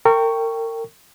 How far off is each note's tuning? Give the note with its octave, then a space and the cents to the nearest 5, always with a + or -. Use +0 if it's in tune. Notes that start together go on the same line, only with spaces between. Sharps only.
A#4 -35 G5 +0 C#6 +0